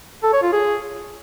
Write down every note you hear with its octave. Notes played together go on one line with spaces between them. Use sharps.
A4
C#5
F4
G#4